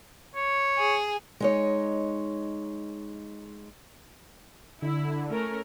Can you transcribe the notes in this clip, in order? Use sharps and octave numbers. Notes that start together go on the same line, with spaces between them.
C#5
G#4
G#3 D#4 C#5
D3 E4
A3 C#4 A#4